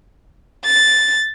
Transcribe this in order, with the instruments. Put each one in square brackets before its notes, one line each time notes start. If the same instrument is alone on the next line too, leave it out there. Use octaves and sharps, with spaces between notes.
[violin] A6